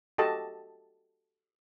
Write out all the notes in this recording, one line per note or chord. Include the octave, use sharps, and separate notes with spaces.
F#4 G4 A4 D#5 A5